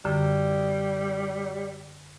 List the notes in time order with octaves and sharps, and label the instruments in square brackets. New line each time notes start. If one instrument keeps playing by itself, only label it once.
[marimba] F#2 D3 [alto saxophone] G3